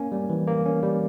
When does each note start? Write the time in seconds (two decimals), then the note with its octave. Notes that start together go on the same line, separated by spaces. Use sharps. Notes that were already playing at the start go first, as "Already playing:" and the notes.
Already playing: A#3 C#4 G#5
0.12 G3
0.29 E3
0.48 A#3
0.65 C#4
0.83 G3